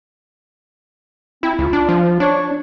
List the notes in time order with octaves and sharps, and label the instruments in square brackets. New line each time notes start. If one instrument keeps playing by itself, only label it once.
[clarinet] C4 [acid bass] E4
[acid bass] C#2 [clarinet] F4
[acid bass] D4
F3
[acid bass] D4 [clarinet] C#5